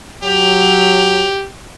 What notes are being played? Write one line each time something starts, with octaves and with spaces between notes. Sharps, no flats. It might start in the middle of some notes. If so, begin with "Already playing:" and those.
F#3 G4 F7